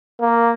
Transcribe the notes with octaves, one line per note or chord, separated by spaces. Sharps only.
A#3